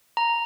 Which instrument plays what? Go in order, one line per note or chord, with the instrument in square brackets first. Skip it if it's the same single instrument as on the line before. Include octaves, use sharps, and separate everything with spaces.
[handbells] A#5